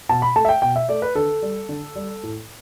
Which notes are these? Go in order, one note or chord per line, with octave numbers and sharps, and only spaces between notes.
B2 A5
B5
A3 A5
E5
G5
B2 G5
E5
A3 D5
B4
D3 A4
G3
D3
G3
A2